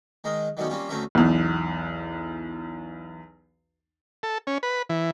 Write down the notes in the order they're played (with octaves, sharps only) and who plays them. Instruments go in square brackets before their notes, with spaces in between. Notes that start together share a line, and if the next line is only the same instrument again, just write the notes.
[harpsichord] D#3 G#3 A#4 D#5
D#3 F#3 G3 A3 B3 C#4
G3 A#3 C4 C#4 F4
D2 A3 C4 C#4 A#4 E5
[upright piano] B1 E2
[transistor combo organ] A4
C#4
B4
E3